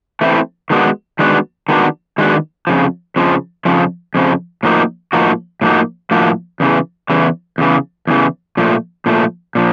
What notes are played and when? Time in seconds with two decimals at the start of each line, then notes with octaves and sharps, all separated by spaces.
0.21 E3 A3 C4 E4
0.70 D#3 G#3 B3 D4 F#4
1.19 D#3 G#3 B3 D4 F#4
1.69 D#3 G#3 B3 D4 F#4
2.18 D#3 G#3 B3 D4 F#4
2.67 F2 C#3 F3
3.16 F2 C#3 F3
3.65 F2 C#3 F3
4.15 F2 C#3 F3
4.63 A2 F3 A#3 D#4 F#4
5.13 A2 F3 A#3 D#4 F#4
5.61 A2 F3 A#3 D#4 F#4
6.11 A2 F3 A#3 D#4 F#4
6.60 E2 C#3 E3
7.10 E2 C#3 E3
7.58 E2 C#3 E3
8.07 E2 C#3 E3
8.57 A#2 F3 A3
9.06 A#2 F3 A3
9.55 A#2 F3